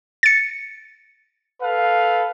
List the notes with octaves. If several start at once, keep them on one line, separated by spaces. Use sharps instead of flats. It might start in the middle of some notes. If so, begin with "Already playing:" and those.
A6 C#7
A4 B4 F5